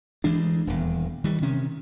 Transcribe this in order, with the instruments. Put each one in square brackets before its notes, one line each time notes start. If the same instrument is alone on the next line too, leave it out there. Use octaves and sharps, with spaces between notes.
[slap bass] D2 E3 G#3 D4
D#1 E2
D#3 E3 G3
C3 D#3 C#4